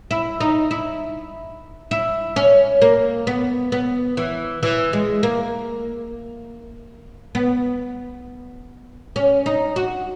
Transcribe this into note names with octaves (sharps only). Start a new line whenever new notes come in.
E4
D#4
E4
E4
C#4
A#3
B3
B3
E3
E3
G#3
A#3
B3
C#4
D#4
F#4